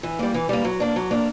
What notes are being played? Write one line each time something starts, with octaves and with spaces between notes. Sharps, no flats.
E3
G3 A#3
E3
G3 A#3
F#3
A#3 D4
F#3
A#3 D4